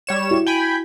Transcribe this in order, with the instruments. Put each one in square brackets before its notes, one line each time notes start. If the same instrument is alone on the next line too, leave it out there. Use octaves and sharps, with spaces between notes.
[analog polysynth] G3 C#5 E7
[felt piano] E4 F#4
[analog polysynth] G5 G#5 B5